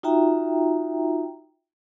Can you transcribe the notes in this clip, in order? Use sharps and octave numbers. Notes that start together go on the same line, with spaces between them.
D#4 F4 F#4 E5 G5 A#5